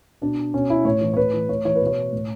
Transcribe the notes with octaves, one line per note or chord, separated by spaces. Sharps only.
B2 D4
B2 C#4
E4
A2 C#5
E3
C#5
A2 B4
E3
A2 C#5
E3 C#5
B4
B2
C#5
A2